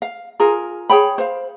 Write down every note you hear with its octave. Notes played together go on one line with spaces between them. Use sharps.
F5
F4 G#4 A#4
G#4 C#5 G5 B5
C5 F5